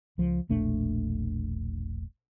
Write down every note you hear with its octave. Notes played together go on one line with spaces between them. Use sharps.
C#2 F3
E1 A#1 A3 D4